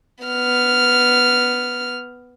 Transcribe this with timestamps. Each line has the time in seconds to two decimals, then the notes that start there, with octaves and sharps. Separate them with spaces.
0.24 B3 F6